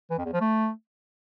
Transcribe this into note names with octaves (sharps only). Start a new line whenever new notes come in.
E3
F2
E2
F3
A3